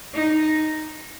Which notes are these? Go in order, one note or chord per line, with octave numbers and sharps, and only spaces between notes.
D#4